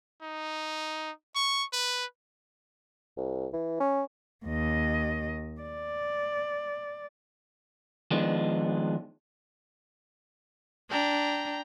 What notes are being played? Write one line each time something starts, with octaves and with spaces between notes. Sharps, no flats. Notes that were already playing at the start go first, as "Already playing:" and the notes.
D#4
C#6
B4
C2
E3
C#4
D#2 D#5
D5
D#3 F3 G#3 B3 D4
D4 G5 A#5